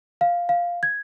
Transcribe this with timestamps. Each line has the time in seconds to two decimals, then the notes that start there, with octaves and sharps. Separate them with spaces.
0.21 F5
0.49 F5
0.83 G#6